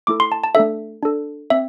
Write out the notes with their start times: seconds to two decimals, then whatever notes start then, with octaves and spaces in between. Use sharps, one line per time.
0.07 A3 E4 A4 D6
0.20 C6
0.32 A5
0.44 A5
0.55 A3 D4 A4 E5
1.03 D4 A4
1.50 C4 E5